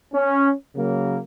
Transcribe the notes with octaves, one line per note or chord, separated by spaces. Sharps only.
C#4
C#3 F#3 A#3